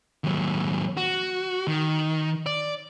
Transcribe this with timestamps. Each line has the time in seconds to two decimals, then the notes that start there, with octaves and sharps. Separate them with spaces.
0.24 D#2 F#3
0.97 F#4
1.68 D#3
2.46 D5